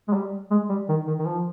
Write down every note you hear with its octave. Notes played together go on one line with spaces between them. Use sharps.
G#3
G3
G#3
G3
D#3
D#3
D#3
F3